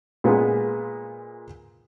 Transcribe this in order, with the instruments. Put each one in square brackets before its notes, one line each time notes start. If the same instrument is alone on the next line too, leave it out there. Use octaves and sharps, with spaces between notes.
[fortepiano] A#2 G#3 B3 F4 G#4